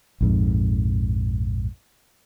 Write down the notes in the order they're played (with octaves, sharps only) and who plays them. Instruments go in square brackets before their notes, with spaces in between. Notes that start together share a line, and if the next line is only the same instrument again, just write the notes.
[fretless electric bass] A#1 F2 G#2